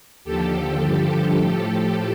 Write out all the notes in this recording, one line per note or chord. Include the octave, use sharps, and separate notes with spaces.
D#2 D3 F3 G4 A4
G2 D3 F3
A2 F3